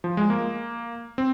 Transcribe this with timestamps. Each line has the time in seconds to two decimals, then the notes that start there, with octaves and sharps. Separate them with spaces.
0.04 F3
0.17 G#3
0.30 A#3
1.18 C4